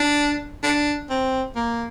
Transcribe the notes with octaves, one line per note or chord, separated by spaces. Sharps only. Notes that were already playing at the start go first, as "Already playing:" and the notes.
Already playing: D4
D4
C4
A#3